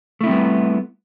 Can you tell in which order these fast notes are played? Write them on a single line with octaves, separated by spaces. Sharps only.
A3 E4 C4 G3 B3